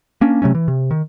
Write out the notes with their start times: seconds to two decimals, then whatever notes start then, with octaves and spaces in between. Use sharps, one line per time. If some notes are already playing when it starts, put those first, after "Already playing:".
0.21 A#3 C#4 D4
0.42 C3 F#3 A3 C#4
0.55 E3
0.68 C3
0.91 D#3